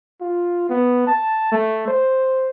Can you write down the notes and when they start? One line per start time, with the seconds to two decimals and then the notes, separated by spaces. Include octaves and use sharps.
0.21 F4
0.69 B3
1.07 A5
1.52 A3
1.88 C5